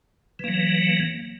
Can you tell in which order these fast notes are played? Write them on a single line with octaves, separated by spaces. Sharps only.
E3 A#3 F#3